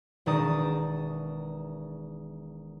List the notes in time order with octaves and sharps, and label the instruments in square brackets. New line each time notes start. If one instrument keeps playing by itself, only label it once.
[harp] E1 D#3 D#4 D5 D#6 E7